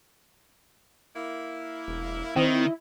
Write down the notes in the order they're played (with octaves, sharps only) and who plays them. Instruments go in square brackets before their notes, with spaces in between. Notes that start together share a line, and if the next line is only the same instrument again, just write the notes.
[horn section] A#3 E4
[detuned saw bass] E1
[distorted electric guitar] D#3 [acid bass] C4 [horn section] D4 C#5 D#5 [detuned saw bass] E4